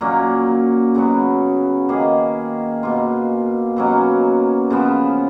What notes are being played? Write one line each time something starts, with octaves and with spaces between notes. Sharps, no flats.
A#2 F#3 A#3 C#4
C#3 F#3 B3 F#4
D#3 A#3 C#4 G#4
B2 A#3 F4
B2 F#3 A#3 C#4
C#3 F3 B3